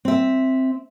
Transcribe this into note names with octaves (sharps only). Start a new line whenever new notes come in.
C4 E5